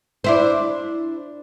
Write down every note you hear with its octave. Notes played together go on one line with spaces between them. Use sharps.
D4 E4 C5